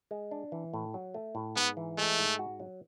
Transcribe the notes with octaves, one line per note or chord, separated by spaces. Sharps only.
G#3
D4
E3
A2
F#3
A3
A2
G#2 B3
E3
G#3 A3
G#2
F#4
F#3